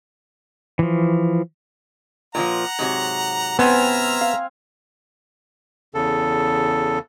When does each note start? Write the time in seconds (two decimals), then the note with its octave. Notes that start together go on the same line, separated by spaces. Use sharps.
0.79 E3 F3
2.35 A#2 E3 F3 F#5 A#5
2.79 G#2 C3 F#3
3.59 B3 C4 E5 G#5 A#5 F6
4.21 F5
5.95 E2 C#3 A4